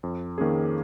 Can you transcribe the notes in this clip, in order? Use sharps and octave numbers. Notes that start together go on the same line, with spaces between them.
F2
D#3 A#3 C#4 G#4